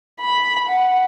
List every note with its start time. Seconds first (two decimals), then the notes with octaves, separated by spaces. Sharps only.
0.20 B5
0.69 F#5